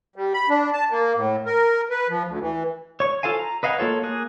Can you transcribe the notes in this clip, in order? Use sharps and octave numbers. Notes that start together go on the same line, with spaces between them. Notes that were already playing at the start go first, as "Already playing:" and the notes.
G3
B5
D4
A5
A#3
A2
A#4
B4
F3
D2
E3
C#5 C#6
F4 A4 C5 F5 G#5
A#5
B4 D#5 F5 F#5 G#5
A#3 F4 A4 C#5
A#3 G#4 F#6